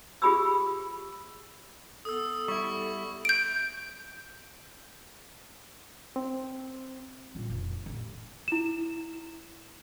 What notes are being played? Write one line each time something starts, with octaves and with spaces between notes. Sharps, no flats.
F4 G4 G#4 B5 D#6 E6
B3 A4 D#6 E6
G3 E4 C#6
G6 D7
C4
A#2 G3
F1
A1
E4 E7